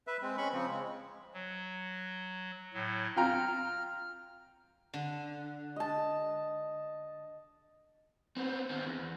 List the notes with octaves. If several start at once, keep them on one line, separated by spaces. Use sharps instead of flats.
B4 E5
G#3 C4
C#4 B5 C#6
C#3 F3 C4
G#3
F#3
A2 F#3
F4 G5 A#5 F6
D3
D#5 A5
B3 C4
D#3 C4
E2